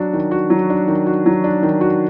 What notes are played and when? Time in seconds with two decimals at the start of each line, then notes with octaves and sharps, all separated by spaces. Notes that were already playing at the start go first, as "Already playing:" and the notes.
Already playing: F#3 D4 F#4
0.14 D#3
0.31 F#4
0.50 F#3
0.70 D4
0.88 D#3
1.06 F#4
1.26 F#3
1.44 D4
1.63 D#3
1.81 F#4